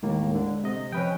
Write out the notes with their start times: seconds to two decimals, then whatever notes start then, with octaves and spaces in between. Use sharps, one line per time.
0.03 D#2 A2 G#3 A#3
0.35 D3
0.64 C3 D#5
0.92 F3 C#4 B4 G5